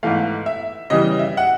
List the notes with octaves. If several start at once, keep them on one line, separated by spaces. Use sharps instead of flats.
G#2 E3 A3 F5
E5
C#3 E3 G3 D#5
E5
F#5